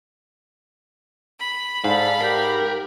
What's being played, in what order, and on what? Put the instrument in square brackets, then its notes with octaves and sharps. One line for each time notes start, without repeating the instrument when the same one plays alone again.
[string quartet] B5
[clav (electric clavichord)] G#2 [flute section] A4 D5 [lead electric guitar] F5
[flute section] G4 G6 [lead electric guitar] A#4